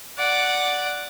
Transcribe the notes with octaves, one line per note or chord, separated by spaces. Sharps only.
D5 F#5